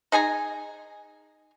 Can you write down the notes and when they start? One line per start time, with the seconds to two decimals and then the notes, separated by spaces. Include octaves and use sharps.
0.12 D#4 G#4 G#5 A#5